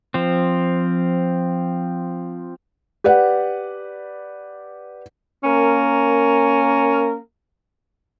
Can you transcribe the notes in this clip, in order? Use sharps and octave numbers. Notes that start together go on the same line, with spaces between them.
F3 C4
G4 B4 D5 F#5
A#3 C#4 A#4